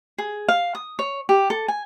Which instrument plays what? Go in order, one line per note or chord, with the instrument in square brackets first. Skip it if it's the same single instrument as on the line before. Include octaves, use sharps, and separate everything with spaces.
[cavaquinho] G#4
F5
D#6
C#5
G4
A4
G#5